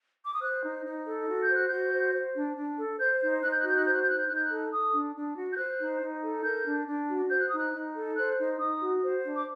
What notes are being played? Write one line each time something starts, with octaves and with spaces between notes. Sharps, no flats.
D6
D#6
C5 F#6
D#4
D#4
A4
F#4
G6
C5
F#6
F#4 G6
C5
C5
D4
D4
A4
C5 G6
D#4 G6
D#4 F#6
G6
F#6
F#4 G6
F#6
C5 G6
F#6
G6
D#4 F#6
G6
D#4 F#6
G6
F#6
A4
A4 D#6
D4
D4
F#4
G6
C5 F#6
D#4
D#4
A4
A#4 G6
D4
D4
F#4
C5 G6
F#6
D#4 D#6
F#6
D#4
A4
C5 F#6
D#4
D#4 D#6
F#4
C5
D4
D6